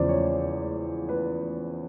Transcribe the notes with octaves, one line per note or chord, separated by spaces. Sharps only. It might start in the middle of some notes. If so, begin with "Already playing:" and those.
Already playing: E2 C#3 F3 C5 D5
C#5
B4